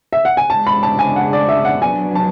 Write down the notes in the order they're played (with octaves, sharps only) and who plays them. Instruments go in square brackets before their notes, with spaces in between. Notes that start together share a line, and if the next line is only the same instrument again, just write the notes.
[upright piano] E5
F#5
G#5
[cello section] C#3 G#3 D4 [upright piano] A5
[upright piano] B5
A5
G#5
F#5
D5
E5
F#5
[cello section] F#3 B3 D4 [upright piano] G#5
[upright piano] A5